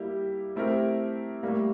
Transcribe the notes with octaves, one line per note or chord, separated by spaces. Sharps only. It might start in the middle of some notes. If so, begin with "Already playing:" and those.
Already playing: G3 A#3 E4 G4
A3 C4 E4 G4 A#4
A2 G3 A#3